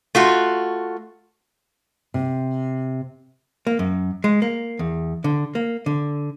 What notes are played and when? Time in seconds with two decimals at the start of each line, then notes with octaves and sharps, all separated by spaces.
0.15 A3 F4 F#4
2.14 C3
3.67 A#3
3.79 F#2
4.24 G#3
4.42 A#3
4.79 E2
5.24 D3
5.55 A#3
5.86 D3